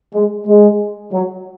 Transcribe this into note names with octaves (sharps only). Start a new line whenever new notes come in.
G#3
G#3
F#3